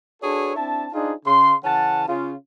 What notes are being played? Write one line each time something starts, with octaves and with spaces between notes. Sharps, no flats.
D4 F#4 G#4 A4 B4 C#5
C4 D4 E4 A5
D4 D#4 F4 G#4 C5
C#3 C6
C#3 E3 C#4 F#5 A5
C#3 F4